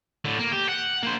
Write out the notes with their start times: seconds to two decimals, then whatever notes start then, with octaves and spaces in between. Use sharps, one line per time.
0.25 A2 D3
0.39 A#3
0.52 G4
0.69 F#5
1.03 A#3 C5